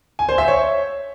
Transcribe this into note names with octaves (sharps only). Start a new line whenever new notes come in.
G#5
C5
E5
C#5